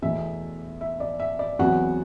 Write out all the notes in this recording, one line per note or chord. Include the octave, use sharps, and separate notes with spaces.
E2 B2 A3 E5
E5
D5
E5
D5
E2 C3 F#3 B3 F#4 F#5